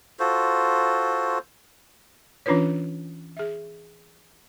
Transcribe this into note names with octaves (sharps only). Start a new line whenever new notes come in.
F4 F#4 A4 C5
E3 C#4 D4 F4 B4 C#5
G#4 E5